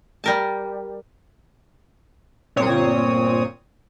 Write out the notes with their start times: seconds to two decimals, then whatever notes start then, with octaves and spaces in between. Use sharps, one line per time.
0.24 G3 A#4 A5
2.56 G1 A#2 C4 C#5 D#6